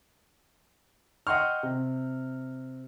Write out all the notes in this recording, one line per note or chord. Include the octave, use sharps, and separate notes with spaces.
D#5 F#5 G5 C6 C#6 F6
C3